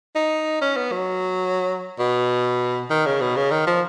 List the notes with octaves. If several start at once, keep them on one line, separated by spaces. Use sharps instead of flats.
D#4
C#4
B3
F#3
B2
D#3
C#3
B2
C#3
D#3
F3